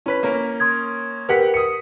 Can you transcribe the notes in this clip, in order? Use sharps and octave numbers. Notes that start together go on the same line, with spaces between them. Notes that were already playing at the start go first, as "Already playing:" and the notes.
C#4 E4 B4 B6
A#3 C#4 A#4
C6 D#6 G#6
G4 A#4 B4 F#5 B6
D#6 C#7